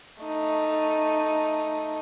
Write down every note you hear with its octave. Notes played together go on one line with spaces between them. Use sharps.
A3 D#4